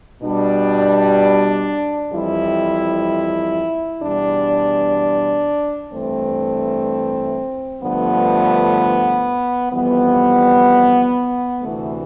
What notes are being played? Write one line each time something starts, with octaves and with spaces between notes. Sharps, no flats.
B2 G3 D4
F2 E3 G3 E4
E2 B2 G3 D4
G2 E3 A3 C4
G2 D3 F3 A3 B3
F2 E3 G3 B3
D2 C3 E3 A3